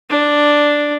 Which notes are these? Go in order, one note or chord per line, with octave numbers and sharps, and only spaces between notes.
D4